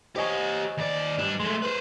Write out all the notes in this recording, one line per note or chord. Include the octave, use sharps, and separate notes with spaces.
G4 C5 C#5 D#5 G#5
D#2 D5
G2 D4
G#3 A3 C6
B4 C5